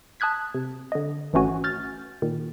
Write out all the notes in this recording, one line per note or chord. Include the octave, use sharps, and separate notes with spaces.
A5 D#6 F#6 G#6 B6
C3
D3 D#5
G#1 E3 A3 C#4 F#4 G#5
F6 G6 A6
A#2 D#3